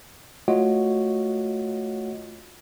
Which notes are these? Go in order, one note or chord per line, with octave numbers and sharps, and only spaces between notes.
A3 F4 F#4 C#5 D#5 F#5